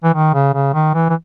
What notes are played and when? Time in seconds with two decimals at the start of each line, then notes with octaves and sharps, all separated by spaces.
0.04 E3
0.14 D#3
0.34 C#3
0.54 C#3
0.74 D#3
0.94 E3
1.09 E3